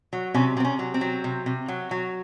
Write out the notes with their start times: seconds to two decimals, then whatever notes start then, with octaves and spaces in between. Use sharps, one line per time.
0.13 F#3
0.34 C3 C#4
0.57 C3 C4
0.65 C#4
0.79 F#3
0.94 C4
1.01 F#3
1.24 C3
1.46 C3
1.68 F#3
1.91 F#3